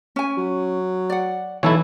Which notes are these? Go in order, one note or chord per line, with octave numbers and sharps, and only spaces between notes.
C#4 G#5
F#3
D5 F#5
B1 E3 E4 A4 C#5